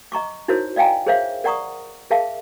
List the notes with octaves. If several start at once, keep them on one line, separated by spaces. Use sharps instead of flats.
D#5 A#5 C#6 D6
D#4 E4 F#4 A#4 C5 C#5
D5 D#5 F5 G5 G#5 A#5
G#4 A#4 C5 C#5 E5 F5
A#4 D5 F#5 A#5 C#6 D#6
G#4 A#4 E5 F5 A5